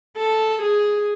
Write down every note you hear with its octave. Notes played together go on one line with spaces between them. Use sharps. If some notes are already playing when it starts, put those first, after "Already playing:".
A4
G#4